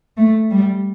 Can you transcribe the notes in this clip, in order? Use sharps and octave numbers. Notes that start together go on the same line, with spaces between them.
A3
G3